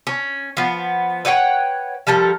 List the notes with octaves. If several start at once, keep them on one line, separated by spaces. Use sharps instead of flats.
C#4
F3 B3
B4 C#5 F#5 G5
F3 G3 A4 A#4